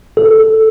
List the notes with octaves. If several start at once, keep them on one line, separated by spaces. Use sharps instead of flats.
A4